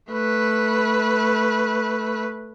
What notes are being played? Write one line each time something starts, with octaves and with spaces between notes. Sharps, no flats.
A3 B4